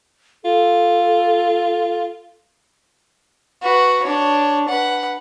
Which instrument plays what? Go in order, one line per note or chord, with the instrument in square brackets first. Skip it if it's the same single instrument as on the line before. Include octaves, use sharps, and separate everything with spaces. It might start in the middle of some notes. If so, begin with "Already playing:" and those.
[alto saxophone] F4 [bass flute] A4
[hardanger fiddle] F#4 B4
D4 C#5
B4 F#5